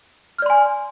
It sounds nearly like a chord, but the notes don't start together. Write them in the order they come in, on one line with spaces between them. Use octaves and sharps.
F6 D5 C6 G#5